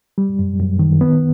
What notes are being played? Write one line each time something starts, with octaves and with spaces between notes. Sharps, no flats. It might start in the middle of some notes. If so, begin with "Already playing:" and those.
G3
F#2
F#2
D#3
B3